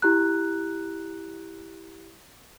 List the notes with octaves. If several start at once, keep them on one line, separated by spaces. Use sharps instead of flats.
E4 G4 A#5 F#6